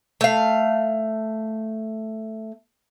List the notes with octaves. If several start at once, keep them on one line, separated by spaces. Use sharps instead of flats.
A3 F5